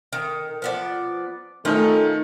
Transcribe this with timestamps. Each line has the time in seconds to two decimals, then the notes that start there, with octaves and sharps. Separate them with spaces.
0.13 D#3
0.62 F3 B3 D5
1.65 D#3 A3 C#4 D#4 F4